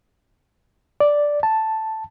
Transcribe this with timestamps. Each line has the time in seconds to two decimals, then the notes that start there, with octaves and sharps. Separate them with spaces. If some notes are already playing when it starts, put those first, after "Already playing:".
1.00 D5
1.43 A5